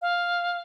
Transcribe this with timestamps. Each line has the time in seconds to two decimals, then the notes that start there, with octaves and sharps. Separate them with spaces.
0.02 F5